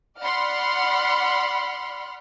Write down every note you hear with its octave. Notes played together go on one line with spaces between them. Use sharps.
D5 F#5 B5 C6 F6